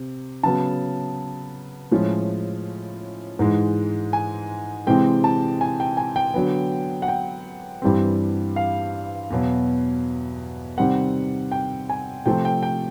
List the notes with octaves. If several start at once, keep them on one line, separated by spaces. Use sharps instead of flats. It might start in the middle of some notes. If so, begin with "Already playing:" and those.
Already playing: C3
C#3 F#3 B3 A5
A2 F3 G#3 C#4
G#2 E3 G#3
G#5
C3 E3 G#3 C4 G5
A5
G#5
G5
G#5
G5
D3 F#3 B3
F#5
G5
G2 E3 G3 C4
F5
E2 B2 F#3
C3 D#3 G3 C4 F#5
G5
G#5
C3 F3 A3 C4 G5
G5
G5